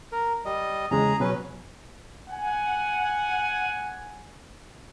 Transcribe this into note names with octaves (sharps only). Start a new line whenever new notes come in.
A#4
G3 D#5
E2 C#3 G#3 G#4 A#5
B2 F#3 C#4 B4
F#5 G#5